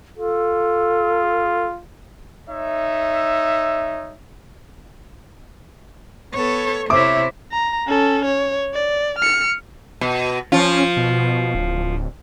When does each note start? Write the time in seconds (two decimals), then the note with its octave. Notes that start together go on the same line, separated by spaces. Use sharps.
0.16 F4 A4
2.47 D#4 C#5 E5
6.34 B3 A4 C#5
6.90 C3 E4 C5 C#5 E5 D6
7.52 A#5
7.87 C#4 A4
8.25 C#5
8.74 D5
9.19 F6 C#7
10.01 B2
10.52 F3 C#4 F4
10.97 B2
11.55 D1